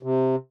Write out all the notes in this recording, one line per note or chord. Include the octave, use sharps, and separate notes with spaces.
C3